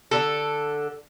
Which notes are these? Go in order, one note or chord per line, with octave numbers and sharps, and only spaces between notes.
D3 A4